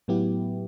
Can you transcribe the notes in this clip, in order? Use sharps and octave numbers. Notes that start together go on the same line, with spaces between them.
A2 F#3 B3 E4 G4